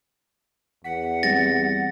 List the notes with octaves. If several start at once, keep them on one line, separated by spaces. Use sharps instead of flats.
E2 F#5 B6
G3 C4 G4 A6 A#6